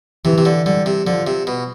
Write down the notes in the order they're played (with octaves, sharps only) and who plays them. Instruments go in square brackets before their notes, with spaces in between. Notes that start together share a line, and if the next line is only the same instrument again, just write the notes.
[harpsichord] C3 [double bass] E3
[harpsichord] C3
D3
[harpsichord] D3 [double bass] G3
[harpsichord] C3
[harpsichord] D3 [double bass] F3
[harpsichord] C3
B2